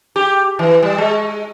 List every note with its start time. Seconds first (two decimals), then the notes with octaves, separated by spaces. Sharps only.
0.16 G4
0.59 E3
0.83 G3
0.98 G#3